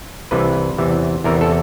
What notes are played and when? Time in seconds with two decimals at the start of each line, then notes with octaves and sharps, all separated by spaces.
0.31 C2 C3 E3 B4
0.78 E2 C3 E3
1.24 E2 C3 E3 A#4
1.41 A4